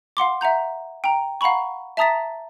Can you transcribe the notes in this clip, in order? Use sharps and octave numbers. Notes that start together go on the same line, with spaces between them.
F5 F#5 C6 D6
E5 F#5 A#5 G6
G5 A#5
F5 F#5 A#5 B5 C#6
E5 A5 A#5 D#6 A6 B6